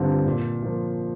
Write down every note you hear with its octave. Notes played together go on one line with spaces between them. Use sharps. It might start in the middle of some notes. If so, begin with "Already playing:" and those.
Already playing: G2 D3 G3 C4 F4
A#2
F3 A#3